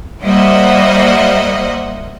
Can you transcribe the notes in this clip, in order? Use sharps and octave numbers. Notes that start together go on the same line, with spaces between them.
G3 A#3 C5 D#5 E5 F#5